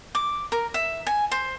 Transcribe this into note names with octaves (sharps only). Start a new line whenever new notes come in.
D6
A#4
E5
G#5
C5